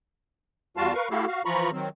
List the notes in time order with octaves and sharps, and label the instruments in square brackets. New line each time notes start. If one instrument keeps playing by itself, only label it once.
[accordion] E2 G3 F4 F#4 F5 A5
A#4 B4 F5 C#6
A3 E4 F#4 G4 A4 F5
F#4 F5
E3 F3 F4 A#5 B5 C#6
D#3 F#3 C4